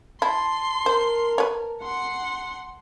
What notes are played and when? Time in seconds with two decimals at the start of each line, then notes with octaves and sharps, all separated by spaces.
0.22 E4 A5 C6
0.86 A#4 C5
1.38 B4 C#5
1.83 F#5 C6